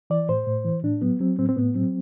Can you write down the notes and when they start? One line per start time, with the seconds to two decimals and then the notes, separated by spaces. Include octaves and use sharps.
0.10 E3 D5
0.29 A2 C5
0.47 A2
0.65 E3
0.83 A2 D4
1.02 F#3 B3
1.20 F#3 C4
1.38 A2 C4
1.49 C4
1.57 A2 B3
1.75 F#3 C4